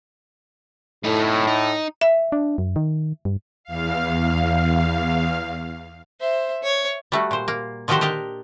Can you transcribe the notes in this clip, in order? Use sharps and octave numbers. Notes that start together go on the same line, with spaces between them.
A2 A3 D#4
D#4
E5
D4
F#2
D#3
G2
E2 F5
C5 E5
C#5
G3 A3 F#4
A#2 C5
A#3
D3 D#3 F3 F#4 G4 C5
D4 G4 A#4 D#5